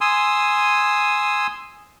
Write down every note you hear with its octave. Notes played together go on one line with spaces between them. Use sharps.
G#5 C6 D#6 E6